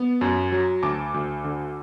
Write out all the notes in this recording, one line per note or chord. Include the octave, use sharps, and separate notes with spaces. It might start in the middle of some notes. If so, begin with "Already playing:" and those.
Already playing: B3
F#2
F#3
D2 A5 D6
D2
D3